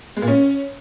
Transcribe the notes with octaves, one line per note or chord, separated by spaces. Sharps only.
G#3
A#2
C#4